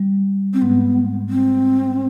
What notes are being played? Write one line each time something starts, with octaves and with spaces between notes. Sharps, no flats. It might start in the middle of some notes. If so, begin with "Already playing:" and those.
Already playing: G3
C4
G#2 G#3 B3
C4